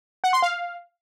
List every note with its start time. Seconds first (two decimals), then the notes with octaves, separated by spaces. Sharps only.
0.24 F#5
0.33 C6
0.42 F5